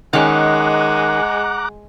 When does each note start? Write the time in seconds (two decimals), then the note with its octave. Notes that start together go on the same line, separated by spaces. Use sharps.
0.13 D#3 G#3 C#4 F#5 A#5 D6 F#6